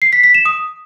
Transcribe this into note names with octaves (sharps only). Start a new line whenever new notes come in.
C7
B6
B6
E7
D#6